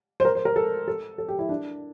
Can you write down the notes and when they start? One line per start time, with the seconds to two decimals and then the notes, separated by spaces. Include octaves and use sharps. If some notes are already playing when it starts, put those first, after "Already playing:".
0.20 C5
0.25 A#4
0.35 C5
0.45 A#4
0.56 A4
0.88 A4
1.18 A4
1.28 G4
1.39 E4
1.49 D4